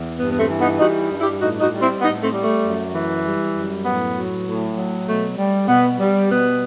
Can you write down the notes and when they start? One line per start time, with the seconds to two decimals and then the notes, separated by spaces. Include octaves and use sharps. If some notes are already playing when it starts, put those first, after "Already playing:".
Already playing: E2
0.18 G2 B3
0.29 B3
0.39 A3 C4
0.50 E3
0.60 B3 D#4
0.79 G3 D#4 F#4
1.10 G2
1.20 E4 G4
1.40 A2 D#4 F#4
1.60 D#4 F#4
1.71 G3
1.81 C4 E4
2.01 A2 B3 D#4
2.22 A3 C4
2.32 G3
2.42 A3
2.63 F#2
2.93 E3
3.24 G3
3.55 F#2
3.85 A2 B3
4.16 F#3
4.46 A2
4.76 F#3
5.06 B2 A3
5.37 G3
5.67 B2 B3
5.99 G3
6.29 B2 B3